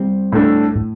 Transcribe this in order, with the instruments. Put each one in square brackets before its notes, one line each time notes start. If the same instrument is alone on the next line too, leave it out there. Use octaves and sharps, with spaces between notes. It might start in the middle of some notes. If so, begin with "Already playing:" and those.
Already playing: [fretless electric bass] G3 C4
[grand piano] A2 A3 D4
[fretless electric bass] A2